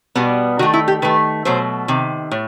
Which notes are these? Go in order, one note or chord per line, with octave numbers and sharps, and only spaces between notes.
B2 G3 B3
D#3 A3 F#4
E4
G4
D#3 A3 B4
B2 F#3 A3 C5
C3 D#3
A2